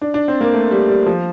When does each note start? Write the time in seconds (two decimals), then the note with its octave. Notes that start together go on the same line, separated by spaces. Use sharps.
0.01 D4
0.14 D4
0.28 C4
0.41 A#3
0.54 A3
0.71 G3
0.88 G3
1.06 F3